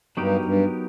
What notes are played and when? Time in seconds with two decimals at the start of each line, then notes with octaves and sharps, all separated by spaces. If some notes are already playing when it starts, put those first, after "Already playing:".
0.17 G2 F#3 B3 D#4 G4 A#4
0.45 G2